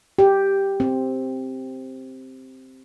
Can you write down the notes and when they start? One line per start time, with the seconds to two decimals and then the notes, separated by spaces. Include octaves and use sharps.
0.19 G4
0.80 C4